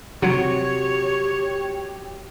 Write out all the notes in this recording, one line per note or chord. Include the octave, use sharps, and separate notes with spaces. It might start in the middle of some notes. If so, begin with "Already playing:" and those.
C3 F#3 G4 C#5